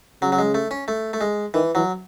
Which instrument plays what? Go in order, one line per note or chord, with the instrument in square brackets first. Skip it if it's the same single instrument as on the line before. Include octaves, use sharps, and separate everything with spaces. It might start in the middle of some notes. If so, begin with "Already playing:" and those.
[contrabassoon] C#3 [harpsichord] F#3
[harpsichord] F#3
G#3
A3
C#4
A3
A3
G#3
[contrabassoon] D#3 [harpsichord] E3
[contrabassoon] E3 [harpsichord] F#3